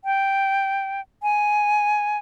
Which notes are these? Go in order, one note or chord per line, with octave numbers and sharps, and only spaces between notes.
G5
G#5